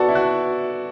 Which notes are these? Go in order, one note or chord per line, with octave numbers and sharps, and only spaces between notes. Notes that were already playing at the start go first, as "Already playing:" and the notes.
Already playing: B3 F#4 A4 D5
E4
F#4